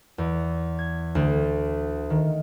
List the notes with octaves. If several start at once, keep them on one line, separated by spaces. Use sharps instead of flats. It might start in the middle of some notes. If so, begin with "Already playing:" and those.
E2
G#6
D2
D#3